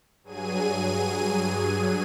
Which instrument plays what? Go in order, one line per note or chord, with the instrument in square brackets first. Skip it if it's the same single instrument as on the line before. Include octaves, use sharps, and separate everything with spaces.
[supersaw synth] G2 F#3 G#4 G#5 D#7